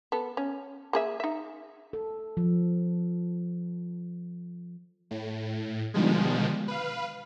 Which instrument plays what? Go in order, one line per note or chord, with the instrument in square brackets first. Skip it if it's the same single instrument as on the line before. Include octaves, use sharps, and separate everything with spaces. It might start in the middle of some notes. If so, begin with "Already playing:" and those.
[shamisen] B3 A4
C#4
A#3 G#4 E5
D#4 E5
[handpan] A4
F3
[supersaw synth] A2
B2 D3 D#3 F3 G3 G#3
B4 F5